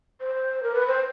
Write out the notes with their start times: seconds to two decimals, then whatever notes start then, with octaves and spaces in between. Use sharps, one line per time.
0.21 C5
0.63 A#4
0.74 B4
0.87 C5